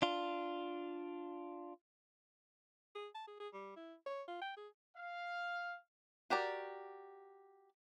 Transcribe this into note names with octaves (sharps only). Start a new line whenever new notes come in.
D4 F4
G#4
A5
G#4
G#4
G3
E4
C#5
F4
G5
G#4
F5
F#4 G4 A#4 D5